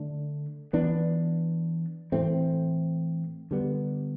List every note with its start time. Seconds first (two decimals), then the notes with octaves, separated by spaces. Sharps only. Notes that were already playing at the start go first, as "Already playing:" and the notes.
Already playing: D3 A3 D4
0.73 E3 B3 D4
2.12 A2 E3 A3 C4
3.51 D3 G3 B3